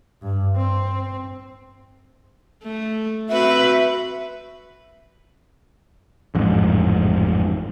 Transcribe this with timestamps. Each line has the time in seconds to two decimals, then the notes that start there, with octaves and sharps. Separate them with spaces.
0.22 G2
0.57 C4
2.64 A3
3.29 C4 F#4 B4 E5
6.35 A1 F2 G#2